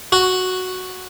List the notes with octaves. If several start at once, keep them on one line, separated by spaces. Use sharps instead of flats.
F#4